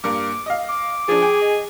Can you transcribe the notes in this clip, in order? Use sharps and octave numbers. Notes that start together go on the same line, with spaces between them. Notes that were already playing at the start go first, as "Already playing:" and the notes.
G2 A#3 D6
D#5 F5
D6
F3 D4 G#4
G5 G#5
D#5